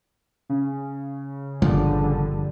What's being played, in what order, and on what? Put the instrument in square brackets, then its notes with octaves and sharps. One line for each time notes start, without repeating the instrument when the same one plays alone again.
[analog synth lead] C#3
[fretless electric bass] G1 [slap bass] G2 A#2 F3 [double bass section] D3 G3